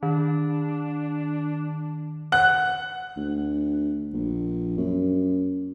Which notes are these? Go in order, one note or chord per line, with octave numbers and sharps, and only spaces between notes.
D#3 D4
F#5 F#6
D2
A#1
F#2